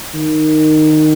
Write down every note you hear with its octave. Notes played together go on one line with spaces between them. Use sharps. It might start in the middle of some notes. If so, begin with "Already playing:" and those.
D#3